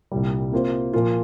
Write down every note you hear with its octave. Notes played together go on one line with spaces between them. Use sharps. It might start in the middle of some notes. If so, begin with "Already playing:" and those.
C2 A#2 G3
C3 A#3 F4 C5
A#2 F3 A#3 F4